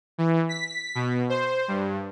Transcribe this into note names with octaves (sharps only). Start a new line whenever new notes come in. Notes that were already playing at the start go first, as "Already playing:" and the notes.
E3
B6
B2
C5
G2